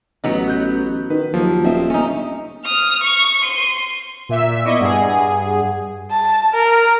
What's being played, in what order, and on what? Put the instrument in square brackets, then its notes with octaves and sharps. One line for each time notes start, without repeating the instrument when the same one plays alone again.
[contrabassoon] A1 [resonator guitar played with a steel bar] F#3 B3 D#4
[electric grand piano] F#6 G6
[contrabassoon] D#3 [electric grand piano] B4
[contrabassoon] D#2 [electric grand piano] F3 F#3
[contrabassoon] D#1 [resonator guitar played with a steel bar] C4 [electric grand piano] D#5 E5
[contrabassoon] G1 [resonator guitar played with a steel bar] C#4 D#4
[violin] D#6 F6
C#6
C6 D#7
[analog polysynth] A#2 E5
[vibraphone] B3 D5 D6 [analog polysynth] E4 D#5 C#6
[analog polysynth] G2 G#4 [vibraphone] F#5
[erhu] A5
A#4